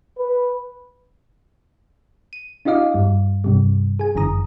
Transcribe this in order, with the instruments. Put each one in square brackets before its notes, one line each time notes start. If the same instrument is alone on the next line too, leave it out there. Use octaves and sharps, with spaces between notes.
[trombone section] B4
[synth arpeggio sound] D#7
D4 E4 F#4 D#5 F5 D6
G2 G3
G2 C3 G3
G#4 G#5
G1 F#2 D3 E3 A#5 D#6